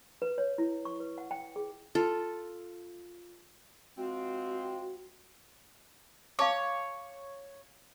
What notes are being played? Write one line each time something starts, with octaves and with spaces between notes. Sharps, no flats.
B4
C#5
E4
C#6
B4
F#5
G5
G#4
F4 A4
F3 G#3 C4 F#4
C#5 F5 A5 D6